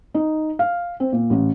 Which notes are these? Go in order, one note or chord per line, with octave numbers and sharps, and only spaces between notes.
D#4
F5
C4
A#2
A1